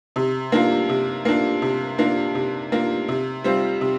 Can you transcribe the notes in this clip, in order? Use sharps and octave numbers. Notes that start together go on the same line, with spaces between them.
C3
A#3 D4 F4
C3
A#3 D4 F4
C3
A#3 D4 F4
C3
A#3 D4 F4
C3
G3 C4 F4
C3